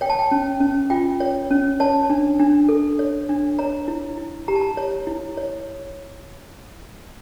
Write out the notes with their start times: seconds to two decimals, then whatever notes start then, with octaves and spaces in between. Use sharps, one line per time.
0.01 C#5 G5
0.10 A5
0.19 G5
0.31 C#4
0.60 C#4
0.90 F4 G5
1.20 C#5
1.51 C#4
1.80 C#5 A5
2.10 D4
2.40 D4
2.69 A4
2.99 C#5
3.29 D4
3.59 C#5 A#5
3.88 E4
4.18 E4
4.48 G4 A#5
4.55 A5
4.61 A#5
4.77 C#5
5.07 E4
5.37 C#5